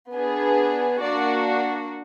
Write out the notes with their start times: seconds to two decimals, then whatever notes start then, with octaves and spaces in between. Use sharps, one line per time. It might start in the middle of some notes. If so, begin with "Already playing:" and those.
0.12 B3 D4 G#4
1.01 A#3 D4 F#4 D5